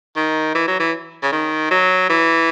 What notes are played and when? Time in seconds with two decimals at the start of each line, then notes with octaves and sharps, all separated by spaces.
0.16 D#3
0.55 E3
0.68 F#3
0.80 E3
1.23 C#3
1.32 D#3
1.71 F#3
2.09 E3